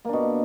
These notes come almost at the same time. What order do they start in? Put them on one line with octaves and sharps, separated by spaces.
A#3 D4 B2